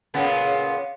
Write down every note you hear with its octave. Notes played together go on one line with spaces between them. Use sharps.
A#2 C#3 B3